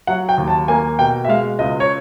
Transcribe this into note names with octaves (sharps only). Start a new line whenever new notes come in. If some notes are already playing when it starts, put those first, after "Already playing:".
F#3 F#5
G5
D#2
A5
A#3 G#5
B2 G5
E5
G#3 F5
C#2 D#5
C#5